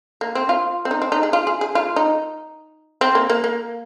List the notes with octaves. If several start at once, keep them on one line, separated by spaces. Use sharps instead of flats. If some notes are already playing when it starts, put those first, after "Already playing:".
A#3
C4
F4
C4
D#4
C4
D#4
G#4
F4
G#4
G#4
F4
D#4
C4
A#3
A#3
A#3